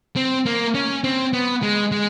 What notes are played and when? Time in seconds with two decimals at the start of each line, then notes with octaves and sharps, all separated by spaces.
0.16 C4
0.46 A#3
0.74 C#4
1.04 C4
1.33 B3
1.63 G#3
1.92 G#3